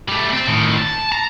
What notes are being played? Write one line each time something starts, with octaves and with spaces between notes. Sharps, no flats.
G3 A3
C4
A2 D#3
A5
A#5